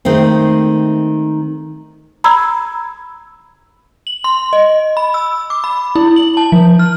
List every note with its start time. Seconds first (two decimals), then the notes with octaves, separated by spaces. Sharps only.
0.05 D#3 G#3 A3 C4
2.24 A#5 B5 E6 G#6
4.07 F#7
4.24 C6
4.53 D#5
4.97 B5
5.14 E6
5.50 D6
5.64 B5
5.96 E4
6.16 F#7
6.37 A5
6.52 F3
6.79 F6